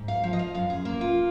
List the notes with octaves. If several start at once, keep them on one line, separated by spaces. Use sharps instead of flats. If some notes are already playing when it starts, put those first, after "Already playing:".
Already playing: G#2
F5
F3 F5
D#5
F5
F#2 F5
G#4
A#3 A#4
F4